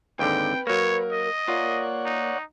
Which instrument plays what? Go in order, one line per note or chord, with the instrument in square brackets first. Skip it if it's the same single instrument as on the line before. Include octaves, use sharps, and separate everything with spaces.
[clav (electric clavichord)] D#2 G#2 D3 [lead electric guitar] C4 [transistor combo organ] B4 [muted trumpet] G5
[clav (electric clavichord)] F#3 A#3 [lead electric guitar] A#4 [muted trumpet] C#5
[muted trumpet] D#5
[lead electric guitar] A#3 A#5 [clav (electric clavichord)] F4 [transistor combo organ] C#5 D5 F#5
[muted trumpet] D#4